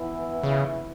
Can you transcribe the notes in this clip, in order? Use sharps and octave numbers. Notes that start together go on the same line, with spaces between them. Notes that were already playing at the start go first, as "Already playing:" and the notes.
Already playing: E3 B3 E4
C#3